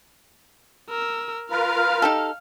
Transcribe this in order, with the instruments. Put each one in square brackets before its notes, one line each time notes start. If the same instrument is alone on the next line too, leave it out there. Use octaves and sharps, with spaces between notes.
[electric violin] A#4 E6
[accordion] F4 A#4 B4 [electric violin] F5 F6
[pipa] D#4 G4 A4